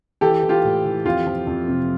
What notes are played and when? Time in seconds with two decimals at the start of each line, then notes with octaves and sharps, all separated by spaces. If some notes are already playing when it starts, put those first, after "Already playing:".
0.21 E3 G4 A4
0.43 E3
0.49 F4 G4
0.64 A2
0.85 E3
1.05 F2 F4 G4
1.26 F3
1.47 F2
1.68 C3